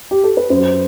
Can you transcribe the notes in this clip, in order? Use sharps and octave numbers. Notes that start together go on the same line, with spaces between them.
G4
A4
B4
F#2 F#3 C5